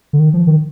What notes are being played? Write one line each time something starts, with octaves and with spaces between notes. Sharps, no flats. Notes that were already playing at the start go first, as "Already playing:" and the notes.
D3
D#3
F3
D#3